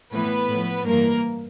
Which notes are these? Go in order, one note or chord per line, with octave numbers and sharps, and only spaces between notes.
A2 E3 B3 B4
A2 F3
G2 E3 A#3 A#4